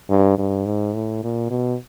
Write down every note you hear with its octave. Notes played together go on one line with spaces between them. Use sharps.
G2
G2
G#2
A2
A#2
B2